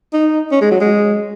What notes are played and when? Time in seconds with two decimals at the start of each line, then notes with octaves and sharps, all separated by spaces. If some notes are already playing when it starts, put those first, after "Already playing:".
0.13 D#4
0.52 C#4
0.61 G#3
0.71 F#3
0.81 G#3